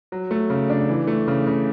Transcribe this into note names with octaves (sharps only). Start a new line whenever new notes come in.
F#3
A3
C#3
D4
E3
A3
C#3
C#3